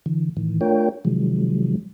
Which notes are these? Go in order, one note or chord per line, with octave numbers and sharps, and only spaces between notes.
D3 E3
A2 D#3 E3
A3 D4 F4 A#4 C#5 G5
C3 D#3 F3 F#3 G#3